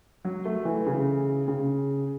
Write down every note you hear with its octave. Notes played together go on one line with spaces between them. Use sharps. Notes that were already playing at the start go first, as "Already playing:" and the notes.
F#3
A3
E3
C#3
C#3